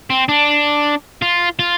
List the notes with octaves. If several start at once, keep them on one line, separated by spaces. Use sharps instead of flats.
C4
D4
F4
F4